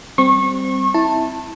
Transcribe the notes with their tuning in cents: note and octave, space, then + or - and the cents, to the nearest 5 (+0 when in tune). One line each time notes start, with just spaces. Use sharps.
G3 +0 C4 +0 C#6 -30
E4 -15 A5 +10